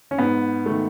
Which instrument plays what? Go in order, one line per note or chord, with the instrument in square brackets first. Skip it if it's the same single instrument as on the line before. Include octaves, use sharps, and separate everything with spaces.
[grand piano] C#4
[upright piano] G#2 [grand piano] B3
[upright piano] D#3 A3